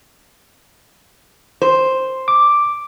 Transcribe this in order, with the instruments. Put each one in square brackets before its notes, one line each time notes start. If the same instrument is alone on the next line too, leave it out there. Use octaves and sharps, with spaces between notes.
[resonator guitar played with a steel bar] C5
[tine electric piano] D6